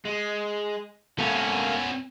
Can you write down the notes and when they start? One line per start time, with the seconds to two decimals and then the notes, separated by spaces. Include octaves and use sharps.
0.05 G#3
1.19 A#3 B3 C#4 A4